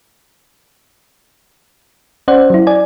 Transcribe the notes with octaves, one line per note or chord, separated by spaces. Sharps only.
C#4 C5 D5 F#5
F#3 E4
D5 G#5